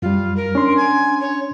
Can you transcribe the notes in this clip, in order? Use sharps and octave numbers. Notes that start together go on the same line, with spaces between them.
F#2 G3 F4
A#4
C#4 D4 C6
G#5
C#5